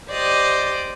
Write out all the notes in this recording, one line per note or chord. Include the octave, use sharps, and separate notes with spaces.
G4 C5 D5 D#5